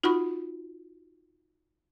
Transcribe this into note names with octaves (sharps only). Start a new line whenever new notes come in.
D#4 F4 F#4 F#5 B5 C#6